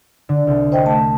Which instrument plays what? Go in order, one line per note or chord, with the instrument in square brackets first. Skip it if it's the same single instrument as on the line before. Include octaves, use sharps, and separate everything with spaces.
[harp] D3
C2
[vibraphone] C5 D#5 G5
A3 A5